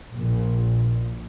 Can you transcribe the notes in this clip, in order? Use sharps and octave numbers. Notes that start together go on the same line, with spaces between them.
A#1 A#2